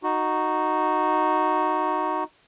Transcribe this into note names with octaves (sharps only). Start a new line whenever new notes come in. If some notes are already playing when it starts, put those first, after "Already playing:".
D#4 F#4